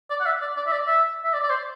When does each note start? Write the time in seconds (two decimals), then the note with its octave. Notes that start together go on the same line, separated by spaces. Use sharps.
0.10 D5
0.20 F#5
0.26 E5
0.41 D5
0.56 D5
0.66 E5
0.72 D5
0.87 E5
1.24 E5
1.33 D5
1.44 D5
1.50 C5